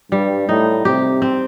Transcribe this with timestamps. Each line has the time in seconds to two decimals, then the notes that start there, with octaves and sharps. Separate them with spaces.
0.12 G2 G3
0.48 A2 D#4
0.85 C3 G4
1.22 C4